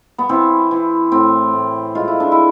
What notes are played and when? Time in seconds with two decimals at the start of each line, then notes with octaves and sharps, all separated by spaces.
0.18 B3
0.29 E3 C4
0.71 E3
1.12 A2 C4
1.53 A2
1.95 G#3 F4
2.08 E4
2.20 D4
2.32 E4